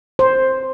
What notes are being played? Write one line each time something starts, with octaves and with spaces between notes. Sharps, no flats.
C5